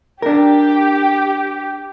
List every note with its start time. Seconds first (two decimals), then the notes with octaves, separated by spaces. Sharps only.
0.22 D4 G4 A#4